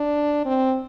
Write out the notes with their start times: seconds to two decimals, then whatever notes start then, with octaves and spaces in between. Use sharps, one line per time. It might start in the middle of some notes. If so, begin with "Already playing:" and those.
Already playing: D4
0.45 C4